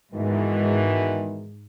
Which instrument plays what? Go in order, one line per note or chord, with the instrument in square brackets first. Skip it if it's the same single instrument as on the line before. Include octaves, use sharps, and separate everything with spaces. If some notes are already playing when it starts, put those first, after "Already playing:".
[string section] G#2 [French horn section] B2 D#3 E3